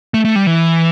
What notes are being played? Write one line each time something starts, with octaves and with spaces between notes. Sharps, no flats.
A3
A3
G3
E3